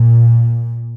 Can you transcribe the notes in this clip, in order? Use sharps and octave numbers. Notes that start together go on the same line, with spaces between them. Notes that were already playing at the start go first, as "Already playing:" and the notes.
Already playing: A#2